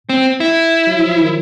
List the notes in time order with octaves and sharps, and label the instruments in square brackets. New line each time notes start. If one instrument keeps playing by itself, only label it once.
[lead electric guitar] C4
E4
[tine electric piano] F#3
F3
D#3